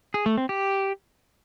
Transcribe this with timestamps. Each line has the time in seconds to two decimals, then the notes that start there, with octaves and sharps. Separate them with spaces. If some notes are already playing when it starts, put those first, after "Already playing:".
0.14 G#4
0.26 A3
0.38 C4
0.49 G4